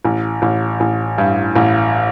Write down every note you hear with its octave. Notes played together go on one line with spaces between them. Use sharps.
A1
A1
A1
G2
A1